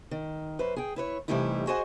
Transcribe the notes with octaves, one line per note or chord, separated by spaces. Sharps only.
D#3
F#2 B4 C5
G#4 G5
E4 B4 C#5
C3 E3 G3 A3 D#4 E4
F#4 G#4 C5 D#5 F#5 G#5